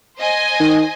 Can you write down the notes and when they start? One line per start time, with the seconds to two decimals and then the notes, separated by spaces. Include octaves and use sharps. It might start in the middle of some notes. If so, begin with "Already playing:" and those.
0.18 C5 D#5 G#5
0.60 D#3